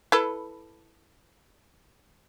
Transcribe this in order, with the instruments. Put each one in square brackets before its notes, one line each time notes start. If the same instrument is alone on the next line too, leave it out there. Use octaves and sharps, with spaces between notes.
[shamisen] E4 A4 B4